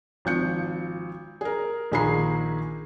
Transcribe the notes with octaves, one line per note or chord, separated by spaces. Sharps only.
G#1 F3 G6 C#7
G#4 A#4
A#1 D#3 G#4 A#5 B5 C7